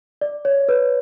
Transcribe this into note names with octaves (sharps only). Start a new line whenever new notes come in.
D5
C#5
B4